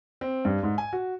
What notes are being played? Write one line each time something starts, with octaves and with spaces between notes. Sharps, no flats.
C4
G2
G#2
G#5
F#4